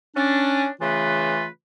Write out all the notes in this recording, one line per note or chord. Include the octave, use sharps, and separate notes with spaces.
C#4 D4
C#3 E3 A3 F4 B4